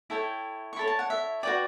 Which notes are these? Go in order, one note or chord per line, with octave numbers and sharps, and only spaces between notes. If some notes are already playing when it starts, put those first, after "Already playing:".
E4 A4 C#5 G5
C#6
E4 A4 C#5 B5
A5
F#5
E5
F#4 B4 D5 G5